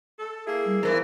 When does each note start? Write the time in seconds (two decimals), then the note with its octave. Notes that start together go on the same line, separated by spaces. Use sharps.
0.19 A4
0.46 A#3 E4 G#4
0.66 G3
0.83 E2 E3 A#4 C5